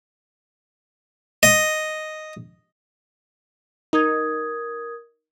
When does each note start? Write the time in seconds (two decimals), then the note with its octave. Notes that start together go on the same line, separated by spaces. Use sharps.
1.43 D#5
3.93 D#4 A#4 D#6 G#6